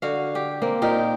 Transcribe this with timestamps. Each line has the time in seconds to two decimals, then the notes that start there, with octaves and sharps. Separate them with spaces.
0.02 D3 F#4 F5
0.35 G4
0.62 A#3 C4
0.82 A#2 D#4 G4 A#4